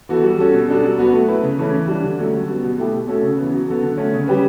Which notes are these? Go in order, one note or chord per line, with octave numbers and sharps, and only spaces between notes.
E3 B3 F#4 A4
G3
C#4 F#4 A4
B2
G3 D4 A4
F#3
B3 F#4 B4
A3
E4 B4
C#3
E3 A3 C#4
E3
G3 D4
D3
F#3 A3 C#4
G3
B3 F#4
B2
A3 E4 G4
B2
A3 C#4 F#4 A4
C#3
E3 B3
F#3
B3 F#4 A4
D3
A3 C#4
C#3
G3 C#4 G4 B4